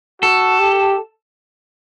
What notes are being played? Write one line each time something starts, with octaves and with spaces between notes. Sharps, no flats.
F#4 A4
G4